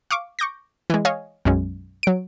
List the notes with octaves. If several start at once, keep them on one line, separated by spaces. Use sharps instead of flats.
F5 C#6 D6
C#6 D6 G6 A#6
E3 G#3
C#5 D#5 F5 G#5
B1 F#2 G#3 C#4
F#3 D7